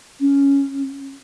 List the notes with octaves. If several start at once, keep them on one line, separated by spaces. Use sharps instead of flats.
C#4